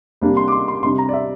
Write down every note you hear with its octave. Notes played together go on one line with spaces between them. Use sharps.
C3 G3 A#3 D4
C6
D6
C6
C6
C3 G3 D4 C6
A#5
D5
E5